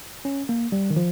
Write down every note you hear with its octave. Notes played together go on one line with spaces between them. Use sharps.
C#4
A#3
G3
D#3
F3